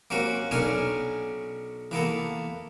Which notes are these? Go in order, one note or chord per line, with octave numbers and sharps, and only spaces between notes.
A#3 C4 C#4 F#4
B1 B2 C#4 D4 A#4 G#5
E3 A#3 B3 A4